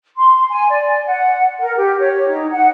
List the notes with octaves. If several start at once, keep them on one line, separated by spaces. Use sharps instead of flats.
C6
G#5
D5
F#5
A#4
G4
C#5
D#4
F#5